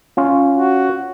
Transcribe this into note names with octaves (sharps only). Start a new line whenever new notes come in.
C#4 F4
F#4